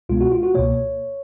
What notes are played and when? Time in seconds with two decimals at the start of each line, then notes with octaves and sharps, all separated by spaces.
0.09 C#2 B2 G#3 B3 F4
0.21 F#4
0.32 F4
0.43 F#4
0.54 C#2 B2 A#3 C#5